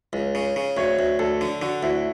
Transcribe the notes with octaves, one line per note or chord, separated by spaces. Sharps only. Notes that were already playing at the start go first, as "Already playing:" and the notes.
C#2
C#3
C#3
D2 C#5
D2
D2 A4
D3
D3 F#4
D2 E4